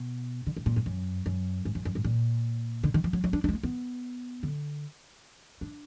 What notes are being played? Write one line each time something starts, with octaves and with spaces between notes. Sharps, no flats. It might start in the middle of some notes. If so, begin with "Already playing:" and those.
Already playing: B2
D3
B2
A#2
G#2
F#2
F#2
G#2
F#2
F#2
G#2
A#2
D3
D#3
F3
F#3
F#3
D4
D4
G#3
A#3
B3
D3
D4